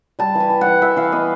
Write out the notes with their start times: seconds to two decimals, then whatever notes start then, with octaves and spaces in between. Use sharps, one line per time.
0.19 G3 A5
0.35 E3
0.40 G#5
0.50 E3
0.61 F#5
0.66 E3
0.82 E3 E5
0.97 E3 F5
1.12 B3 D#5